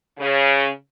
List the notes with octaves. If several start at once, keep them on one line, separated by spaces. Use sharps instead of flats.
C#3